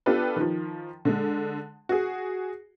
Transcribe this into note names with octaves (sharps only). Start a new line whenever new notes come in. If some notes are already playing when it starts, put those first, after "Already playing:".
B3 D4 F4 G4 A4 B4
D#3 F3
D3 G#3
F#4 G#4